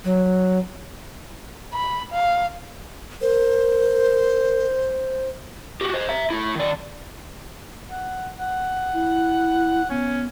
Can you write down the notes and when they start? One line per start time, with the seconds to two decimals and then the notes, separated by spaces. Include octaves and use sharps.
0.04 F#3
1.74 B5
2.13 F5
3.21 A#4 C5
5.81 F#4 G4
5.93 C5 D#5
6.09 E5 A#5
6.30 A3 E4
6.55 D#3 D5
7.90 F#5
8.40 F#5
8.94 E4
9.90 B3 C#4